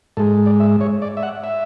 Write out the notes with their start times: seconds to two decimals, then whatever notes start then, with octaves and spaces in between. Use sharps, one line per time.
0.17 G#2 G#3 A4
0.46 D5
0.60 E5
0.81 C#5
1.02 D5
1.17 E5
1.23 F#5
1.44 E5